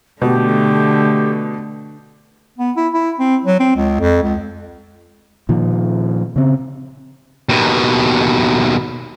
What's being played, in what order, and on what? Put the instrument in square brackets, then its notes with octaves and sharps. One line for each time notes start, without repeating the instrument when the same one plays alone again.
[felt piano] B2 [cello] D3 [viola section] A3 [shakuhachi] G4
[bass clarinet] B3
E4
E4
C4
F#3
C4
C#2
F2
C#2
[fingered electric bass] A#2 D#3 F3
C#3 C4
[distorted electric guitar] D#2 B2